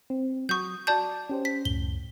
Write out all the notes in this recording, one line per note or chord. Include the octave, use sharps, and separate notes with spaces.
C4
F#3 F#4 C#6 D#6 G6
F#4 D5 A5 D6 G6
C#4 G4 C5
B6
C#2 F#2 A2 G7